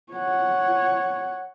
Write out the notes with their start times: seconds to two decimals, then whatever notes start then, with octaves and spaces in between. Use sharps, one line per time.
0.13 C#5 F#5